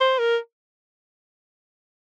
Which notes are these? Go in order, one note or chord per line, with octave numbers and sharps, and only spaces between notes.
C5
A#4